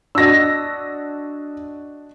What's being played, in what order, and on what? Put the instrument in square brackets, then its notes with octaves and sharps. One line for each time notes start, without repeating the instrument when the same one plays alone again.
[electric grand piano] D4 F#4 D#5 [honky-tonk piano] E6 A#6